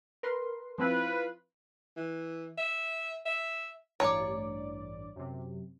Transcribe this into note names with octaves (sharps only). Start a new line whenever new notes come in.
A#4 B4 C6
F3 C4 E4 F4 B4
E3
E5
E5
A1 G2 C#5 D5 A#5 D6
F#2 C3